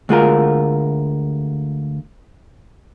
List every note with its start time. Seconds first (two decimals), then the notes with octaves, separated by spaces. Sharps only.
0.09 D2 G#3 F4 A#4